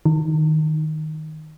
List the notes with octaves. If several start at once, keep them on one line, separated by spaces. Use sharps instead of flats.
D#3